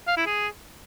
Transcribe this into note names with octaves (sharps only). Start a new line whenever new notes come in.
F5
E4
G#4